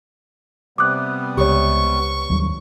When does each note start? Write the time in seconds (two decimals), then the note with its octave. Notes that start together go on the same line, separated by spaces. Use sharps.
0.78 C3 G3 B3 D6 D#6 F#6
1.37 C#2 G4 C#5 C#6
2.30 D#2 F#3 G3